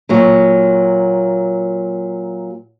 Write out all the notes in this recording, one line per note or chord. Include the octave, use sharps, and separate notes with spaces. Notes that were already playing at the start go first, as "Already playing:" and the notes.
A#2 F#3